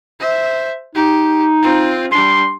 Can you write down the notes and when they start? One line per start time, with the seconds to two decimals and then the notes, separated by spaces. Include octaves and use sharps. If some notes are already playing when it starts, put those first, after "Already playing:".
0.20 C5 E5
0.95 D#4 G4
1.63 C4 F4
2.12 G3 D4 C6